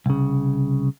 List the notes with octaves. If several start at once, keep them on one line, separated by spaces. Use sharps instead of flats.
C2 C#3